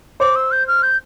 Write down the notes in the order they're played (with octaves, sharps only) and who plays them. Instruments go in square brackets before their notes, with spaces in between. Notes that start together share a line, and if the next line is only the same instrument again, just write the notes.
[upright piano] C5 [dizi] D6
[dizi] E6
G6
F6
G6